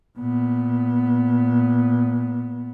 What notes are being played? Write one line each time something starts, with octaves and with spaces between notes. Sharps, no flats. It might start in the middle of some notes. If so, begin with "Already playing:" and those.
A#2 B3